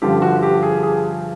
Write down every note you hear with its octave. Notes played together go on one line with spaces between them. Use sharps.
G2 D3 F3 G4
F#4
G4
G#4
G#4